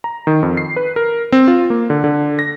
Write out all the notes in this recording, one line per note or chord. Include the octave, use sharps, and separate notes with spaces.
A#5
D#3
F2
C7
B4
A#4
C4
F4
A#3
D3
D3
A#6